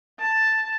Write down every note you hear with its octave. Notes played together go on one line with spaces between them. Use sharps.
A5